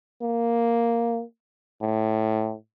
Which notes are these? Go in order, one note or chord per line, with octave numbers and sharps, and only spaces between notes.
A#3
A2